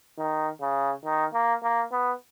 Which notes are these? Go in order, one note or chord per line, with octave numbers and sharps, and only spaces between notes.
D#3
C#3
D#3
A#3
A#3
B3